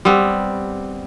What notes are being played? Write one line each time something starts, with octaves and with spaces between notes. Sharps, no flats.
G3 B3 C4